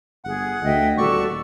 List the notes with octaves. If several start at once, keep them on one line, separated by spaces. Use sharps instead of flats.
G1 G#4 F#5
D2 D#5 E5 G5
D#1 F#4 A4 D5 C#6